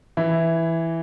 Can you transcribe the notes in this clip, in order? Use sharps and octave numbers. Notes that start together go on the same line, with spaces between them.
E3 E4